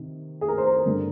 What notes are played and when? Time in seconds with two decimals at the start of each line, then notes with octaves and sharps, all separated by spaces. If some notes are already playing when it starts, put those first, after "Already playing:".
Already playing: C3 D#3
0.41 G#4
0.48 A#4
0.58 C5
0.66 A#4
0.76 A#4
0.86 G2 D3